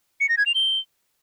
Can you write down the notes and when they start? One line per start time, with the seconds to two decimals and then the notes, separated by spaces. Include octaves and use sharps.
0.21 C#7
0.29 A#6
0.38 G#6
0.46 F7
0.55 G7